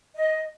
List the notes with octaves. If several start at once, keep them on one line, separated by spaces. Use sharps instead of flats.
D#5